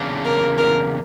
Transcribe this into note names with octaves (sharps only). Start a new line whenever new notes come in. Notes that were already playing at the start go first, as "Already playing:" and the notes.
Already playing: E2 C#3 F#3 A#3 D4
A#4
A#4